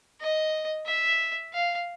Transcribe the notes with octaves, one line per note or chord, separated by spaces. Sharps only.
D#5
E5
F5